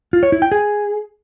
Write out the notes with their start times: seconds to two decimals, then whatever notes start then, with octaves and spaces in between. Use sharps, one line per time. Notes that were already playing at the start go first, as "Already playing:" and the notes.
0.13 F4
0.23 C#5
0.32 E4
0.42 G5
0.52 G#4